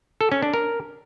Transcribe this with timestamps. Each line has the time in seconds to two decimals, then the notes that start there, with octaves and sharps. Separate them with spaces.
0.21 A4
0.32 C#4
0.43 D4
0.54 A#4